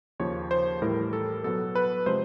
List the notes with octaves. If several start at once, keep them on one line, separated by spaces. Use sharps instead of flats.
D#2 C#3 F3 C#5
C5
A2 E3 G3 A#4
A4
B2 F#3 B3 A4
B4
C3 F3 G#3 C5